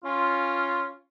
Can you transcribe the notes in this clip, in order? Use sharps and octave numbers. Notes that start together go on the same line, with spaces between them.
C#4 F4